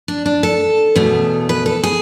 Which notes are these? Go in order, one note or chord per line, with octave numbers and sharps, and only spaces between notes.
D4
D4
A4
E2 B2 A3
B4
A4
G#4